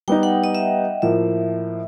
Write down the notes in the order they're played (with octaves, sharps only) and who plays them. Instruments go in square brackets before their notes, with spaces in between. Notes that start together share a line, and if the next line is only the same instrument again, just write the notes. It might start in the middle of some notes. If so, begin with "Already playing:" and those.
[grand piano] G3 B3 D#4 [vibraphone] G5
[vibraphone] F#5
D#5
E5
[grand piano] A2 F3 A#3 [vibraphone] E5